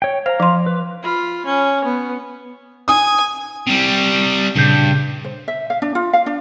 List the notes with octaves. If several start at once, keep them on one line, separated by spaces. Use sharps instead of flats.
C#5 G5
C5 F5 A#5
F3 C6
B4
F4 B5
C#4
B3
G#5 D#6
C3 G3
G2 A#2 C#3 G6
C5
E5
F5
D4
F4
F5
D4